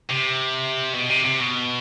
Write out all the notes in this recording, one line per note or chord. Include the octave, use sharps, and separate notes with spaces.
C3
B2
C3
C3
B2